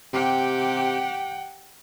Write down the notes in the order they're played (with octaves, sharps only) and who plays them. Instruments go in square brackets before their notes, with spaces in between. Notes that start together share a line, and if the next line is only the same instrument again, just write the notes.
[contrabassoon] C3 [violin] G4 [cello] F#5 G5